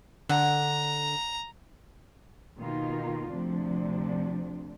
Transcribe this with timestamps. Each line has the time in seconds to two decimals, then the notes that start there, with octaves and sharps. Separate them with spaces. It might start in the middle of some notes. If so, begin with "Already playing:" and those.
0.29 D3 F#5 A#5
2.58 B2 D#3 A#3 D#4 F4
3.32 D2 C3 F3 D4